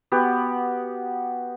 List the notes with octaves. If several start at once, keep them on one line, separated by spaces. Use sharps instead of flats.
B3 F#4 G4